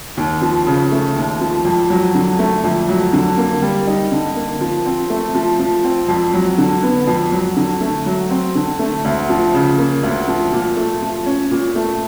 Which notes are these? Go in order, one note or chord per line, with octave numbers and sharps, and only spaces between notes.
D#2
F3
C#3
A3
D#2
F3
F2
F#3
D3
A3
F2
F#3
D3
A#3
G3
D#4
D3
A#3
F3
C4
A3
F3
F3
C4
F2
F#3
D3
B3
F2
F#3
D3
A3
F#3
C4
D3
A3
D2
F3
C#3
A#3
D2
F3
A#2
A3
F3
C#4
A#2
A3